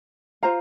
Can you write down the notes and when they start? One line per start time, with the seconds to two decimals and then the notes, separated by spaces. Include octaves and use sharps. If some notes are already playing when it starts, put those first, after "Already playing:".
0.43 F4 C5 F5 A#5